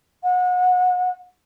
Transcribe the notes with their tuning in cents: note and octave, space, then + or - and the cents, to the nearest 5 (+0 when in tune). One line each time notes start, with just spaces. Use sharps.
F#5 -30